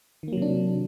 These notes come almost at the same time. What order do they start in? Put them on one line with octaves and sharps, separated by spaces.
D#3 A#3 F#3 C3 D4